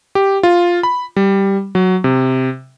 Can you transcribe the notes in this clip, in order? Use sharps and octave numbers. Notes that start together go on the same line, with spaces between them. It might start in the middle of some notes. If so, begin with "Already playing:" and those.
G4
F4
B5
G3
F#3
C3